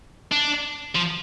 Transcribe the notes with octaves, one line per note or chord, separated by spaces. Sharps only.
D4
F3